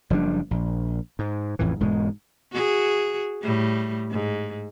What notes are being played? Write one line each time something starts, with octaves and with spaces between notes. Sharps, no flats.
F#1 F3 G3 D4
A#1
G#2
A1 F2 A2 E3
E1 G#2 B2 G#3
F#4 G#4
A2 G3
G#2